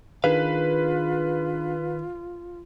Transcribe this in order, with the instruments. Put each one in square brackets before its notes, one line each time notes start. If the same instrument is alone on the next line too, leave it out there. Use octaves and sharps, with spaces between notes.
[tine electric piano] D#3 [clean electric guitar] D4 G#4 F5 [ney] F4 [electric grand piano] B4